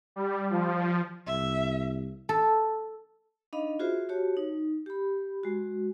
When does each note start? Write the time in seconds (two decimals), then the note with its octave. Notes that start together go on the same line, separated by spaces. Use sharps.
0.16 G3
0.50 F3
1.27 C2 E5
2.29 A4
3.53 D4 D#4 D#5 F5 B5
3.79 F4 F#4 G#4 C5 E5
4.09 F#4 G4 C#5 A5
4.37 D#4
4.86 G4 B5
5.43 G#3 F#4